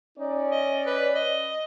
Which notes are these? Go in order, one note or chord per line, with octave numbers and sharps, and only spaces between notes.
C#4 D#4 D5
D#5
B4
D#5